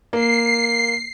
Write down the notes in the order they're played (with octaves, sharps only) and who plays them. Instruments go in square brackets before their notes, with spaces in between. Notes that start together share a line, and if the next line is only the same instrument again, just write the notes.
[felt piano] A#3 [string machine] C7